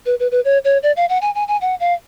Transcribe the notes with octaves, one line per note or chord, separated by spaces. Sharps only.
B4
B4
B4
C#5
C#5
D5
F5
F#5
G#5
G#5
G#5
F#5
F5